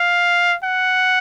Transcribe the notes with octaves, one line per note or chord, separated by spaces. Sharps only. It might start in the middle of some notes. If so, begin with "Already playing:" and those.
Already playing: F5
F#5